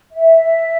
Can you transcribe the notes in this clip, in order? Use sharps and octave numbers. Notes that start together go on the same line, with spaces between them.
E5